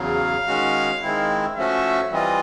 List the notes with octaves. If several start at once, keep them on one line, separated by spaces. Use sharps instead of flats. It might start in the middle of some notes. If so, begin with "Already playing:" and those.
Already playing: E2 C#3 F#3 F5
D#3 G#3 C#4 F#4
D#3 G#3 C4 E4
F3 A3 C#4 F#4 E5
E3 G3 C4 F4 D#5